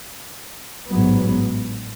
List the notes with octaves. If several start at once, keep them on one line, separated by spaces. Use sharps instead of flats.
A1 G#2 F#3 B3